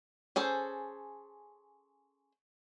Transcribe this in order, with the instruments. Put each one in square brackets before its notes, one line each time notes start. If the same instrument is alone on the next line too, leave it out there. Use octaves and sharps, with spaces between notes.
[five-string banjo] C#4 G#4 A4 C5